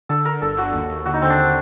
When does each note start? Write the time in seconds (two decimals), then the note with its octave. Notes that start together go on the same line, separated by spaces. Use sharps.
0.09 D3 A4
0.25 D3 A#4
0.42 G1 A4
0.57 D3 F#4
0.73 D#2
0.89 D#2
1.06 D3 F#4
1.14 D#4
1.22 D3 C4
1.30 D4